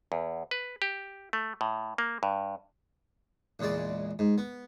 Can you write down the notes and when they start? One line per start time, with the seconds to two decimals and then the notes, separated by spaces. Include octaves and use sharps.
0.12 E2
0.51 B4
0.82 G4
1.33 A3
1.61 A2
1.98 A#3
2.23 G2
3.59 A#1 E2 C#3 G#3 D5
4.19 G#2
4.38 B3